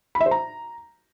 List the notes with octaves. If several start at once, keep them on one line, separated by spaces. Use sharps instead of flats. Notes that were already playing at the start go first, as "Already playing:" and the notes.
B5
E5
C5
A#5